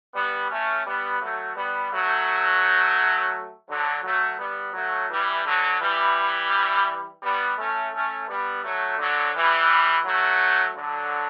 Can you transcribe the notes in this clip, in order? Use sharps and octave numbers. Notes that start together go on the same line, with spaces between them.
G3 B3
A3 C#4
G3 B3
F#3 A3
G3 B3
F#3 A3
D3 F#3
F#3 A3
G3 B3
F#3 A3
E3 G3
D3 F#3
E3 G3
G3 B3
A3 C#4
A3 C#4
G3 B3
F#3 A3
D3 F#3
E3 G3
F#3 A3
D3 F#3